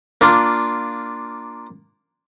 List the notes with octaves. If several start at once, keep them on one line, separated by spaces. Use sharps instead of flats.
A#3 D4 F4